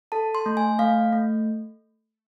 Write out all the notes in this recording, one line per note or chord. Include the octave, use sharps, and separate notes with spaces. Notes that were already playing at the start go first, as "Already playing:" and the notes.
A4 A5
C6
A3
G#5
A3 F5
A3